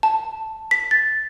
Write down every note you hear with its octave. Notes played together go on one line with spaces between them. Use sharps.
A5
B6
A6